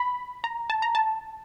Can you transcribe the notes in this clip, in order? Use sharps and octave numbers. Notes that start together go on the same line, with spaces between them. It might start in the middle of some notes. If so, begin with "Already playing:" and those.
Already playing: B5
A#5
A5
A#5
A5